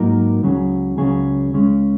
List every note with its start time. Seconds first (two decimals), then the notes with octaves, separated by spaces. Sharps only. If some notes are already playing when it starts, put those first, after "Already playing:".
Already playing: G#2 F#3 A#3 D#4 A#4
0.42 C#2 C#3 F#3 C#4 G#4
0.97 C#2 C#3 F#3 C#4 G#4
1.53 C#2 C#3 G#3 C#4